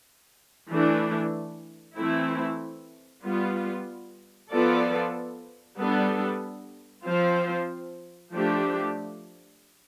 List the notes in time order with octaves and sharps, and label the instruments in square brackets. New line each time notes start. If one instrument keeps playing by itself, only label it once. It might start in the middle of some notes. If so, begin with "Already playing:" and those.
[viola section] E3 A3 D4
E3 A3 C4 E4
G3 B3 F4
F3 B3 F4 A4 D5
G3 B3 D4 A4
F3 C4 F4 C5
F3 A3 D4 G4